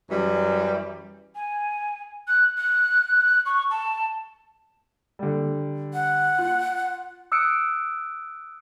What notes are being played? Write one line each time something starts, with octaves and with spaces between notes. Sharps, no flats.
F#2 E3 G3
G#5
F#6
F#6
C#6
A5
D3 G3
F#5
F4
D#6 E6 F#6 C#7 D7